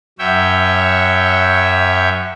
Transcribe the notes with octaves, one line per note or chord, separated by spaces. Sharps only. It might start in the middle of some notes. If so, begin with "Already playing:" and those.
F#2 C#5 E5 G5